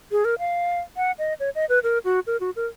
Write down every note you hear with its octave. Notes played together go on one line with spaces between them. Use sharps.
G#4
A#4
F5
F#5
D#5
C#5
D#5
B4
A#4
F#4
A#4
F#4
A#4